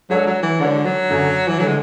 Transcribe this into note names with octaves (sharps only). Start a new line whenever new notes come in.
F#3 G#3 D4 F#4 A4 C#5
F#3
E3
D3 G#3 D4 F#4 A4 C#5
F#3
F#2 D3 A3
E3
D3 F#3 A3
G#3